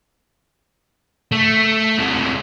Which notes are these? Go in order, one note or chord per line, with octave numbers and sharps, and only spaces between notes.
A3
C3 G#3